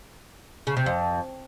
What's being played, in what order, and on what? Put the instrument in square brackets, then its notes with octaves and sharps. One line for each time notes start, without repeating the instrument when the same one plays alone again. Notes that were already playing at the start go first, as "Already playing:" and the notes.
[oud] C#3
C3
F2